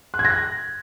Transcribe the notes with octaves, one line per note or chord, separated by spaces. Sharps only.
F#6
G#6
A#6
F#6